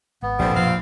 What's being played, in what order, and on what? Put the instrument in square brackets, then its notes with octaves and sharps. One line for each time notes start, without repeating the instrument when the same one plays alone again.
[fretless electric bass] G#1 [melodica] B3
[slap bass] A#1 [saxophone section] D3 G3 C4
[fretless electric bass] F#2 B2 F3 [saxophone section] C4 F5